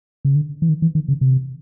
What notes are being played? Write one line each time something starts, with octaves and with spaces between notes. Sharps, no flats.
C#3
D3
E3
D#3
E3
D#3
C#3
C3